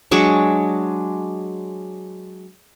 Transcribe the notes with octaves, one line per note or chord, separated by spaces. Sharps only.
F#3 G#3 D4 C#6